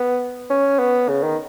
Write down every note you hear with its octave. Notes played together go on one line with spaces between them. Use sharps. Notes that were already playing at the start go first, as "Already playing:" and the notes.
Already playing: B3
C#4
B3
C#3
D#3